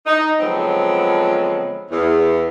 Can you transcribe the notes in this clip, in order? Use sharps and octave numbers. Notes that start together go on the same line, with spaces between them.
D#4
D3 F3 F#3 G#3 B3 C4
E2